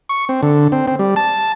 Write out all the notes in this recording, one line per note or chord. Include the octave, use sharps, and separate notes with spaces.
C#6
C4
D3
C4
C4
G3
A5